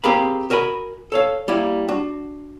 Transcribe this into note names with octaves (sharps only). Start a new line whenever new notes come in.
C4 G4 G#4 A#4 F5 B5
F#4 A#4 D#5 G#5 B5
A4 C#5 F5
G3 A#3 E4
D4 F#4